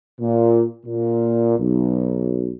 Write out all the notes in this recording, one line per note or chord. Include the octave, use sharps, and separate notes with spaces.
A#2
A#2
B1